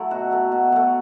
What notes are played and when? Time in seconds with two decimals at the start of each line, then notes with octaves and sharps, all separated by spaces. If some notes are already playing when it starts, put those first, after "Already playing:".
Already playing: F#3 A3 E4
0.11 B2 F#4
0.31 F#3 A3
0.52 B2
0.72 F#3 A3